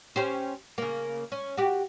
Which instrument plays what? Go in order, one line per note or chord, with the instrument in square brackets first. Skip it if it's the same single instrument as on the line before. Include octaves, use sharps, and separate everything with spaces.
[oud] C#4 G4 C5
C#3 A#3
C#4
F#4 G4